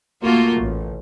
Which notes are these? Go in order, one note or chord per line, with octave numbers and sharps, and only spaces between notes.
A3 A#3 F4 F#4
A1